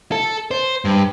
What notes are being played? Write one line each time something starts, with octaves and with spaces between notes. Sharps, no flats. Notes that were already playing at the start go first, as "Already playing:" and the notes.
A4
C5
G2